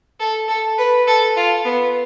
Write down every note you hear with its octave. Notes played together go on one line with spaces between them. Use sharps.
A4
A4
B4
A4
F4
B3